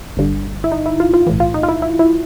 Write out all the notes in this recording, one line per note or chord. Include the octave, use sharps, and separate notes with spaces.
G1 G2 D3
E4
D#4
E4
F4
F4
B1 A2 E3
F4
D#4
F4
E4
E4
E4